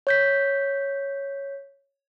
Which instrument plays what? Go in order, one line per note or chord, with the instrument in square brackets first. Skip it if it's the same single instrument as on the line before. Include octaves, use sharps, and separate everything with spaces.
[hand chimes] C#5 G6 B6